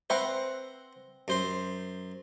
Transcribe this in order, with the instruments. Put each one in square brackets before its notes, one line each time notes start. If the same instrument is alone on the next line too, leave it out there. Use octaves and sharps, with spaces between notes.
[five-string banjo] C4 B4 E5 [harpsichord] C5 F#5 A#5
[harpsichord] F#2 C5 C6